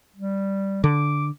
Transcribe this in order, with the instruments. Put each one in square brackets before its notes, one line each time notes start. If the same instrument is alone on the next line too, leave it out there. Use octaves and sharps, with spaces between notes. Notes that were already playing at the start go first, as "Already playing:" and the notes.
[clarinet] G3
[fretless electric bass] D3 [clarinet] D6